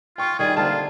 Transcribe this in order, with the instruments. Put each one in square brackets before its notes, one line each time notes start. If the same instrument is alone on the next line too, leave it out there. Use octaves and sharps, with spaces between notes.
[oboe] F4 [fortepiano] G5 C#6
[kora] D#3 G3 E4 [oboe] G#4
[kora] D3 C4 [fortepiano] A#3 A5 [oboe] F4